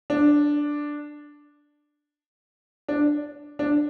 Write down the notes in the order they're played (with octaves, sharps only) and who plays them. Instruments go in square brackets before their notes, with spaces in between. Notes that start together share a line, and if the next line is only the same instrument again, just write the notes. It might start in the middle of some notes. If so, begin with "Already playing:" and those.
[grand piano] D4
D4
D4